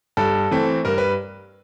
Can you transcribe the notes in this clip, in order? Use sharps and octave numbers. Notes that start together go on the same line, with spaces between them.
G2 A4
E3 A3 C4
G2 A#4
B4